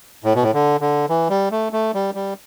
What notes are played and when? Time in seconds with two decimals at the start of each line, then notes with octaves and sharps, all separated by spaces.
0.24 A2
0.34 B2
0.42 A2
0.53 D3
0.81 D3
1.09 E3
1.30 G3
1.51 A3
1.72 A3
1.94 G3
2.15 G3